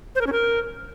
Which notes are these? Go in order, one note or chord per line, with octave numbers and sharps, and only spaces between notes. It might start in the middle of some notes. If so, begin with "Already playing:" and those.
C5
A#4
C#4
A#4